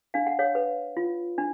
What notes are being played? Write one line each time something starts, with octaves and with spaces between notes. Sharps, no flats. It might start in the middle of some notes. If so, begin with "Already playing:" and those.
D4 F5
F#5
C#5 F5
B4
F4
D4